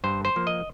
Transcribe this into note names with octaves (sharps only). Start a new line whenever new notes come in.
G2 C5
C5
F3 A#3
D#5